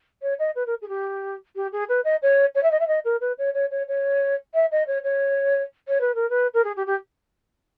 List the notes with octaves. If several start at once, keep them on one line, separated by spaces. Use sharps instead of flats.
C#5
D#5
B4
A#4
G#4
G4
G4
G#4
B4
D#5
C#5
C#5
E5
D#5
E5
D#5
A#4
B4
C#5
C#5
C#5
C#5
E5
D#5
C#5
C#5
C#5
B4
A#4
B4
A#4
G#4
G4
G4